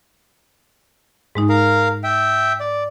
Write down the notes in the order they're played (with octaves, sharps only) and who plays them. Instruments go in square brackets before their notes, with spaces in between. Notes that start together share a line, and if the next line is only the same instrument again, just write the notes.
[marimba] G#2 G#3 D#4
[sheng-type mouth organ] A#4 F5
E5 G5
D5